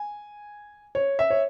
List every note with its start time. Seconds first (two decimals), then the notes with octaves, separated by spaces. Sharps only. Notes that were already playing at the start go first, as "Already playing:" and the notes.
Already playing: G#5
0.95 C#5
1.19 E5
1.30 C#5